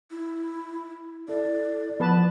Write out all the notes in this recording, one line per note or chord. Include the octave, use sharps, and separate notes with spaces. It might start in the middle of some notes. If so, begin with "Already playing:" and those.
E4
E4 A4 D5
F3 B3 B4 A5